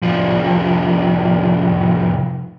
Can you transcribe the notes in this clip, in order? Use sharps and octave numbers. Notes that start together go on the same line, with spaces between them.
C2 F3